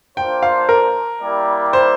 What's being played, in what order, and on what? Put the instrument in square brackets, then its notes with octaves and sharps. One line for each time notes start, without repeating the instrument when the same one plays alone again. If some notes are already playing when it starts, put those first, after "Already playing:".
[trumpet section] A#3 D4 F4 C5 [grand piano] G5
[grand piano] F5
A#4
[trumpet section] G3 A#3 E4 G4 D5
[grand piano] C5